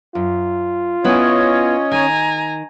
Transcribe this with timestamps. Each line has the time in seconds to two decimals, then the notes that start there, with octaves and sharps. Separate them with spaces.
0.15 F#2 F4
1.04 B3 C#4 E4 C#5 D#5
1.92 D#3 G#5 A#5